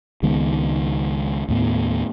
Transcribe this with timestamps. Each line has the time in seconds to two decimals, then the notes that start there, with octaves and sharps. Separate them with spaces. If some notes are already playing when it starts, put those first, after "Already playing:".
0.23 C#2 D#3 G#3 B3
1.48 D#2 A2 B3